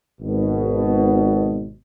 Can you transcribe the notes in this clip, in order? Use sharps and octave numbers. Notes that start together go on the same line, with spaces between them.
G#1 B2